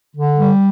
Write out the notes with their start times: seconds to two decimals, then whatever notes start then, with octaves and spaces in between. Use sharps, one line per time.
0.15 D3
0.38 G3